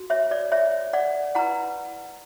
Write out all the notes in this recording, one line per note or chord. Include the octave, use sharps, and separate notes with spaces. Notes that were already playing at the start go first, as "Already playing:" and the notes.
Already playing: F#4
C#5 E5
D5
C#5 E5
D5 F#5
E4 B4 F#5 A#5